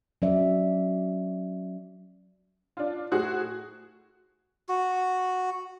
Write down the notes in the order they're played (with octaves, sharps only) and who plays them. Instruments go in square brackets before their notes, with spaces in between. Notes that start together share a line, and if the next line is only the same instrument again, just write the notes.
[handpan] F#3 C#4 D5 E5
[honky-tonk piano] D4 F4
A2 F#4 G#4 C5 F#6
[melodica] F#4